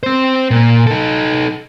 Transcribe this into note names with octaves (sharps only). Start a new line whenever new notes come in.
C4 C5
A#2
D#4 A4